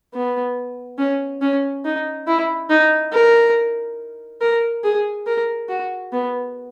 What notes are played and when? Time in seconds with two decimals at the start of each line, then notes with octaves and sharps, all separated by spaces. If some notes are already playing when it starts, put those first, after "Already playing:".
0.14 B3
0.99 C#4
1.41 C#4
1.85 D#4
2.27 E4
2.70 D#4
3.12 A#4
4.41 A#4
4.84 G#4
5.27 A#4
5.69 F#4
6.12 B3